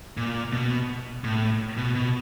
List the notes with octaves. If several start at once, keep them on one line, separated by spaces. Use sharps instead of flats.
A#2
B2
A2
B2
B2